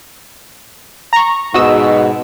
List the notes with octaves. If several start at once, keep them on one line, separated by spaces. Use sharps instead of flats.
A#5 C#6
G#2 B2 F#4 D#5 E6